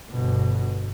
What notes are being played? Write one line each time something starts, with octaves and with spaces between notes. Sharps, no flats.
G1 B2